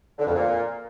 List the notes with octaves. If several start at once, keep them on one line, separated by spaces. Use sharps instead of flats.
D3
F2
A#2